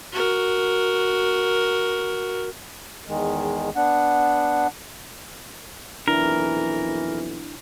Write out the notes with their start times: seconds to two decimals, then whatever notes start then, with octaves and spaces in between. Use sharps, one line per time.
0.12 F#4 A#4
3.06 E2 D#3 G#3
3.76 B3 D4 F#5
6.08 B1 F2 E3 D4 E4 A#4